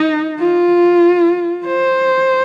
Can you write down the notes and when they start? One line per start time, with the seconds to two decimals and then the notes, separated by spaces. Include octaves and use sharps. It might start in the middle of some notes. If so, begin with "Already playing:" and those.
Already playing: D#4
0.40 F4
1.66 C5